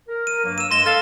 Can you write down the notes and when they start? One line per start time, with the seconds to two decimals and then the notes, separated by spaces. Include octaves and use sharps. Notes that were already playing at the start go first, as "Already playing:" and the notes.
0.09 A#4
0.27 D#7
0.45 G2 F#3 A#3
0.58 E6 D#7 E7
0.71 G2 G#3 C6 A#6 E7 G7
0.86 A4 F5 F6 A6 G7